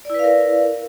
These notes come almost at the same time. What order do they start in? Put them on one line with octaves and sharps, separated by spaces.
D5 E4 B4 F5 A#4